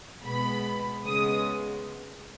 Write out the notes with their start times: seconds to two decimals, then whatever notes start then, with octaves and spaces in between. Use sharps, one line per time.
0.26 B2 G#3 B3 B5
1.05 C#3 G#3 B3 D#6